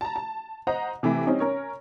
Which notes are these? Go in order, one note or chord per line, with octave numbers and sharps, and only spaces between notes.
A5 A#5
A5
C5 D#5 F#5 A#5
C3 E3 A3 E4
G3 C4 C#4 D#4
C#4 A#4 C#5